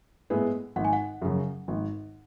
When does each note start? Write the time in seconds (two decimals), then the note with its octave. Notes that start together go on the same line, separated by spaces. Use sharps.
0.30 A2 G#3 B3 E4
0.76 G#1 F#5
0.85 G#5
0.93 F#5
1.22 F#2 C#3 F#3
1.68 G#1